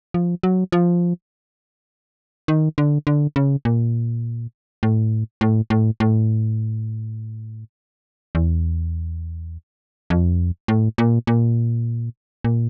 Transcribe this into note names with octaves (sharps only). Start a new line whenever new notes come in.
F3
F#3
F3
D#3
D3
D3
C#3
A#2
A2
A2
A2
A2
E2
F2
A2
A#2
A#2
A#2